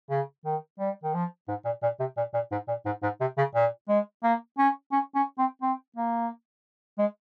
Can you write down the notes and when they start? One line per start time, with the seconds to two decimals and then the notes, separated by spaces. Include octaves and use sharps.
0.10 C#3
0.45 D#3
0.79 G3
1.04 D#3
1.14 F3
1.48 G#2
1.65 A#2
1.83 A#2
2.00 C3
2.17 A#2
2.34 A#2
2.51 G#2
2.68 A#2
2.86 G#2
3.03 G#2
3.21 C3
3.38 C#3
3.55 A#2
3.88 G#3
4.23 A#3
4.58 C#4
4.92 C#4
5.15 C#4
5.38 C4
5.62 C4
5.96 A#3
6.98 G#3